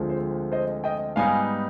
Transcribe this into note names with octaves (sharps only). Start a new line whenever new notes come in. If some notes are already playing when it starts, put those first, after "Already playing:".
Already playing: D2 D3 F3 G#3 C4
C5
C5 D#5
D#5 G5
G#2 G3 B3 D#4 F5 G#5